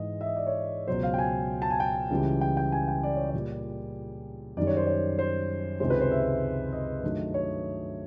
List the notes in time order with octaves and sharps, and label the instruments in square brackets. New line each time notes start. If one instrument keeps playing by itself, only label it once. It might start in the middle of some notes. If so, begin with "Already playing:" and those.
Already playing: [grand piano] G#2 E3 G#3 D#5
E5
D#5
D5
C#5
C#2 B2 F#3 C5
F5
G5
G#5
A5
G#5
G5
C#2 C#3 E3 G3
G5
G5
G#5
G5
D5
C#5
A#2 G3 D5
F#2 D#3 G3 D5
C#5
C5
C#5
C5
C#2 C3 D#3 G#3 C5
B4
C5
E5
D#5
G2 D#3 F#3 A3
C#5